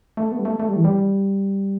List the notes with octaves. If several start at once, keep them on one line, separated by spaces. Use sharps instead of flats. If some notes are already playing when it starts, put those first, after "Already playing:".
A3
B3
G3
A3
A3
G3
E3
G3